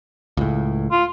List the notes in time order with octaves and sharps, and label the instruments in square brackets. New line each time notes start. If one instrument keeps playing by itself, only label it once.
[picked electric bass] C#2 A2
[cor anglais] F4